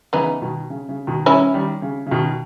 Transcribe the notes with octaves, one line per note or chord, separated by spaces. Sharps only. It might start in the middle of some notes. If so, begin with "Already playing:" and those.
C#3 E3 B3 D#4
B2 D#3
C#3
C#3
B2 D#3
D#3 G3 C#4 E4
D#3 G3
C#3
C#3
B2 D#3